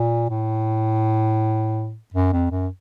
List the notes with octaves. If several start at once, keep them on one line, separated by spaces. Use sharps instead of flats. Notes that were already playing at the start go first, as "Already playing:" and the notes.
Already playing: A#2
A2
F#2
F2
F#2